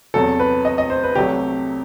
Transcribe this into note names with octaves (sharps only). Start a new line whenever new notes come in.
E2 C3 F#3 A4
B4
D#5
D#5
C5
B4
C2 C3 F#3 A3 G4